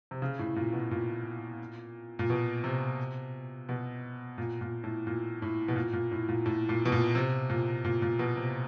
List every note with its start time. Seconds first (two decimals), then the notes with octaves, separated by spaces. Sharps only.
0.11 C3
0.22 C#3
0.39 A2
0.56 A#2
0.73 B2
0.91 A#2
2.19 A#2
2.30 B2
2.64 C3
3.69 B2
4.38 A#2
4.61 A#2
4.84 A2
5.07 A#2
5.42 A2
5.68 B2
5.76 A#2
5.93 A#2
6.12 A2
6.29 A#2
6.46 A2
6.69 A#2
6.85 B2
6.92 A#2
7.15 C3
7.50 A#2
7.85 A#2
8.02 A#2
8.19 B2
8.37 C3